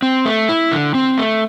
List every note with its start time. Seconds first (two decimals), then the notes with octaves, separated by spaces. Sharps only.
0.02 C4
0.26 A3
0.49 E4
0.71 D3
0.95 C4
1.18 A3